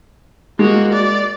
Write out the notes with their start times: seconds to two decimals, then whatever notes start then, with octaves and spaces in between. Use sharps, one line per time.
0.59 G#3 A#3 F#4
0.93 D5